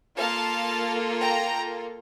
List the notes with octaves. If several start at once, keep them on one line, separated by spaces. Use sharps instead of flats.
A#3 F4 A4 F5 A5
G5 A#5